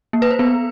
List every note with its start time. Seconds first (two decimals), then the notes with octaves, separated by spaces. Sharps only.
0.13 A#3
0.22 B4
0.31 C5
0.39 B3